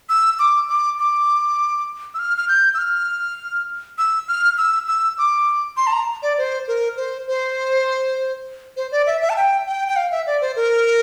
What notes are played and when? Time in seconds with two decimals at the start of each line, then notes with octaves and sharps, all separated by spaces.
0.09 E6
0.39 D6
0.69 D6
1.00 D6
2.14 E6
2.19 F6
2.38 F6
2.49 G6
2.74 E6
2.78 F6
3.98 E6
4.28 F6
4.58 E6
4.88 E6
5.18 D6
5.77 C6
5.87 A5
5.92 A#5
6.23 D5
6.38 C5
6.68 A#4
6.97 C5
7.27 C5
8.77 C5
8.92 D5
9.07 E5
9.22 E5
9.30 A5
9.36 G5
9.66 G5
9.88 G5
9.96 F5
10.11 E5
10.27 D5
10.41 C5
10.56 A#4